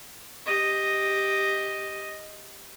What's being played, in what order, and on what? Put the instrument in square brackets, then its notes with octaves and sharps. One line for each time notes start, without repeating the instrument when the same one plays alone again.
[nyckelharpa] G4 D#5